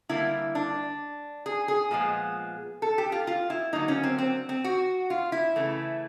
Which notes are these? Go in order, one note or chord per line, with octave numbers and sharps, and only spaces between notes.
D3 G3 A#3 E4
D4
G#4
G#4
A#2 F3 G#3 B3
A4
G4
F4
F4
E4
D3 F#3 A#3 D#4
C#4
C4
C4
C4
F#4
F4
E4
C#3 E3 A3